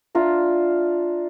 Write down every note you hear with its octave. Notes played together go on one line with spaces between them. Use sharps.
D4 F4 E5 A#5